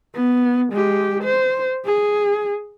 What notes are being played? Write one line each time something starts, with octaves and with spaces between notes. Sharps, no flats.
B3
G#3 G4
C5
G#4